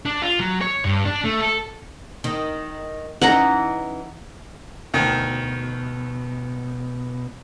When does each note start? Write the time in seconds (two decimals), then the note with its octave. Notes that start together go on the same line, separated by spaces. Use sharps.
0.05 D4
0.22 F4
0.40 F#3
0.61 C#5
0.85 G2
1.05 D4
1.25 A3
1.41 A4
2.24 D#3
3.22 E3 C#4 D#4 F#5 A#5
4.94 D2 B2 D#3